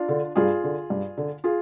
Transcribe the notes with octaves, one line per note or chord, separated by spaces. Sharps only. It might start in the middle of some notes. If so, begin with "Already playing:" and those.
Already playing: D4 F4
D3
G2 F4 G#4
D3
G2
D3
F4 G#4